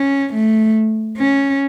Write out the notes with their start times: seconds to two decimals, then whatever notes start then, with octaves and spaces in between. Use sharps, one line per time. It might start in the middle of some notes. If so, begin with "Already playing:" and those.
Already playing: C#4
0.33 A3
1.17 C#4